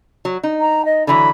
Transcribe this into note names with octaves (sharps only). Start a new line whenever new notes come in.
F#3
D#4
A#5
D#5
D3 E3 F#3 B5